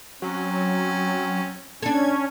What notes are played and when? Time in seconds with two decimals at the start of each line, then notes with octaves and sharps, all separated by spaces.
0.22 F#3 C4 C#4
1.83 C#4 D4 A4 G#6